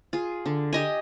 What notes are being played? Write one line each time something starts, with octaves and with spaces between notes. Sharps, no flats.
F4 G#4
D3
G4 D#5 G#5